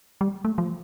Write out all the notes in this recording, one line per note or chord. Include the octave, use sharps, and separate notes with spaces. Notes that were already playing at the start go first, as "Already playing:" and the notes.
G3
A3
F3